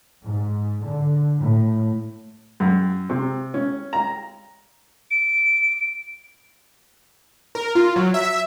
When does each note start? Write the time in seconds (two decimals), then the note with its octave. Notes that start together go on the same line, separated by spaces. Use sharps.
0.24 G#2
0.86 D3
1.37 A2
2.60 F#2
3.10 C3
3.54 C#4
3.93 A#5
5.11 D7
7.55 A#4
7.75 F4
7.96 F#3
8.14 E5